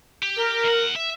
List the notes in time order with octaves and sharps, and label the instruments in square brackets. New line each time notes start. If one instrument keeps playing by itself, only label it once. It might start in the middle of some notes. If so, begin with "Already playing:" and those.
[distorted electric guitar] G4
[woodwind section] A#4
[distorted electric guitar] E2 F#5
E5